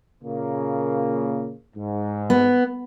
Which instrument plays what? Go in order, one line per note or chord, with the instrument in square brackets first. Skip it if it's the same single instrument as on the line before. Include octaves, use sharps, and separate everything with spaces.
[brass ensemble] A#2 C#3 A#3
G#2
[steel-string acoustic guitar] B3